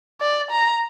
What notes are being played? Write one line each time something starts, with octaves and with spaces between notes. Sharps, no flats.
D5
A#5